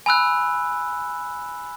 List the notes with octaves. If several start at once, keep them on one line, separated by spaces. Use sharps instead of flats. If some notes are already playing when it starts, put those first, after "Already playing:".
G#5 B5 E6 F#6